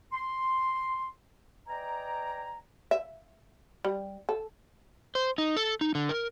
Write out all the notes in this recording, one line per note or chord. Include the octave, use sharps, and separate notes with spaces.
C6
B4 D5 D#5 G5 G#5 A#5
E5
G3
A4
C5
D#4
A4
D#4
D3
A#4